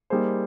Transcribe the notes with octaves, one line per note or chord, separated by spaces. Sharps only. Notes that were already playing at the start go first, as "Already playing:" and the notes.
G3 A#3 D#4 G#4 C5